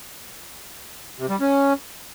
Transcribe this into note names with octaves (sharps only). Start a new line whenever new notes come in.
C3
G3
C#4